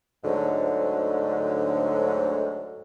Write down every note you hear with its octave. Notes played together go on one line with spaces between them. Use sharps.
D2 G#2 D3 F#3